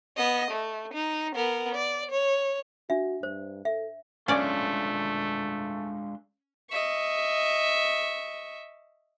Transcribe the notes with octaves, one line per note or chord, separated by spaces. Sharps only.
B3 D#5
A3
D#4
B3 A#4
D5
C#5
D4 F#4 E5
G2 C5
A4 E5
G#3 A3 C#4 D4 F4 D5
D#5 E5 C#6